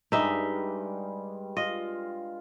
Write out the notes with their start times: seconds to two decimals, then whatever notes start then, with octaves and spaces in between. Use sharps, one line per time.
0.12 G2 G3 G#3 D#4 E5
1.57 F4 D#5